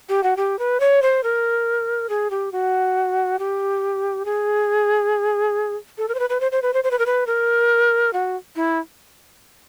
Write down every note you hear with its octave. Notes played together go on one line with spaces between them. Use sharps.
G4
F#4
G4
B4
C#5
C5
A#4
G#4
G4
F#4
G4
G#4
A4
A#4
C5
B4
B4
C5
C5
B4
C5
C5
B4
A#4
B4
A#4
F#4
E4